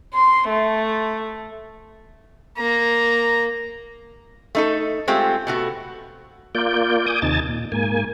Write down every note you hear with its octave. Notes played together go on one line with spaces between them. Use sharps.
C6
A3
A#3 A#5
A3 D#4 A4
G#3 A3 C4 F4 G4
B2 A3 F#4
A#3 F4 D5 G6
G#5 D6 D#6 G6
D#2 C3 D#4 G#5 A5 A6
A#2
G#2 A#3 G#5